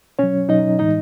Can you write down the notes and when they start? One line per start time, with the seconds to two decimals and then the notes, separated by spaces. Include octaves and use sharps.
0.19 B2 F#3 C#4 C#5
0.49 B2 F#3 D#4 D#5
0.79 A2 E3 G#3 D#4 D#5